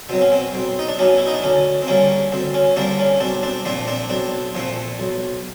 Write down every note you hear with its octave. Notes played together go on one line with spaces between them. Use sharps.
B2 F#3 C4
C#4
C4
B1 C4
D#4
D4
B2 F#3 C#4
E4
D#4
D4
D2 C#4
C4
D3 G3 A#3 C#4
D2 C4
C#4
D3 G3 A#3 C4 D4
C#4
B1 C4 D4
C4 D4
A#2 F3 A3 C4 D4
C4 D4
B1 C4 D4
A#2 F3 A3 C4
B1